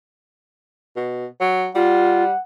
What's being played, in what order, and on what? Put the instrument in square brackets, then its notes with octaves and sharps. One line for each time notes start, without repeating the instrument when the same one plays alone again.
[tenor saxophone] B2
F#3
[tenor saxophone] G3 [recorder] F4 [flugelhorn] F#5